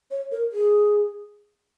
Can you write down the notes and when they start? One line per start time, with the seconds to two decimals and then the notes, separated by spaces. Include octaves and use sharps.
0.11 C#5
0.32 A#4
0.52 G#4